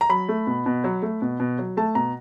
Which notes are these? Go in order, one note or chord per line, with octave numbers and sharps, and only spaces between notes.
A#5
F#3 B5
A3
B2
B2
F#3
A3
B2
B2
F#3
A3 A5
B2 A#5